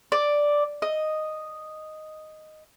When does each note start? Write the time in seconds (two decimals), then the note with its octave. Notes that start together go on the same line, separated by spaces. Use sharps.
0.12 D5
0.82 D#5